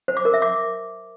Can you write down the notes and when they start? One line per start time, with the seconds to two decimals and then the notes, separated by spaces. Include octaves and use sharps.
0.08 C5
0.17 D6
0.25 A#4
0.34 E5
0.42 D6